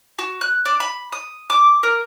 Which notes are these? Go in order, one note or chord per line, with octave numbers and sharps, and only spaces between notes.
F#4
F#6
D4
B5
D#6
D6
A#4